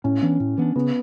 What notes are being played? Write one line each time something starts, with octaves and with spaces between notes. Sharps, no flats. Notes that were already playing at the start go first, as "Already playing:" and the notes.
A2 C#4
E3 B3 D4
A2
E3 B3 D4
C#3 B3